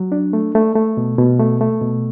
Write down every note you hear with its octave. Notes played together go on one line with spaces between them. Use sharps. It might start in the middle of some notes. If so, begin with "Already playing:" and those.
Already playing: F#3
D4
A3
A3
A3
B2
B2
A3
A3
B2